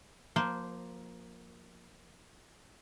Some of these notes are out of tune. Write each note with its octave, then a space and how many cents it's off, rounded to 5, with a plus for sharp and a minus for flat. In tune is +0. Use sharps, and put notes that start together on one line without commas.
F3 +30 A#3 +10 C5 -10